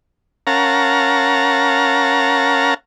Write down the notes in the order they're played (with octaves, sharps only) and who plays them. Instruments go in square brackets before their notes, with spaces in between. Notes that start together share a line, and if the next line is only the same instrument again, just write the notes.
[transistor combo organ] C#4 A#4 F5 F#5 A5 A#5